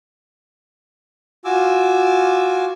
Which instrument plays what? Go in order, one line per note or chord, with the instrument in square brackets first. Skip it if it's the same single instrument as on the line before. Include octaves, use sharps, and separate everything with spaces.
[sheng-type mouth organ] F4 F#4 G#5 D6 E6